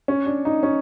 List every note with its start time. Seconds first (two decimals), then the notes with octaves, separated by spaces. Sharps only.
0.08 C#4
0.26 D4
0.45 D#4
0.63 C#4